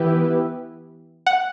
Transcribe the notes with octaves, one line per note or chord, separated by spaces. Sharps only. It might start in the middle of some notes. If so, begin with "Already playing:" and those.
Already playing: E3 B3 E4 G4 B4
F#5